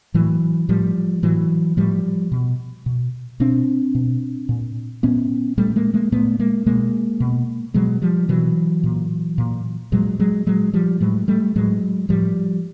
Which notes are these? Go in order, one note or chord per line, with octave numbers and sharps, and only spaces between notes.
A2 E3 F#3
A2 F3 G3
A2 E3 F#3
A2 F3 G3
B2
B2
B2 C4 D4
B2
A#2
A#2 B3 C#4
A#2 G3 A3
G#3 A#3
G#3 A#3
A#2 A3 B3
G#3 A#3
B2 G#3 A#3
B2
B2 F#3 G#3
F3 G3
B2 E3 F#3
A#2
A#2
A#2 F#3 G#3
F#3 G#3
A#2 F#3 G#3
F3 G3
A2 F#3 G#3
G3 A3
A2 F#3 G#3
A2 F3 G3